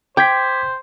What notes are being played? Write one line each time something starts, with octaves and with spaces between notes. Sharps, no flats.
C5 G5 D6 G#6 B6